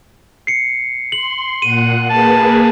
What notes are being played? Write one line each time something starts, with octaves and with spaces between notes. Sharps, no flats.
C7 C#7
C6 F#7
A#2 F#5 F#6 D#7
A#3 G#4 B4 A5